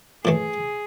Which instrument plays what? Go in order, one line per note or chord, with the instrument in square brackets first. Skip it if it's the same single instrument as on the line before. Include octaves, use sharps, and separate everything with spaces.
[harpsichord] A2 E3 A3 [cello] G#4